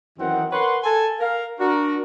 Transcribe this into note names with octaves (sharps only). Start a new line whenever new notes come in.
F#2 D#3 E3 C4 D#4 F#5
A#4 B4 C#5 F#5 C6
A4 G#5 A5
A#4 F5
D4 F#4 A#4